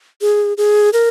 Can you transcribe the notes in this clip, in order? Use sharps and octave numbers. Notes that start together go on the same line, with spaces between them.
G#4
G#4
A#4